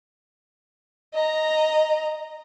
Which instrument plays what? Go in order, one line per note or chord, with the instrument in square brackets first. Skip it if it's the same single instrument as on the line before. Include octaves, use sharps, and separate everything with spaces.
[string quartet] D#5 A#5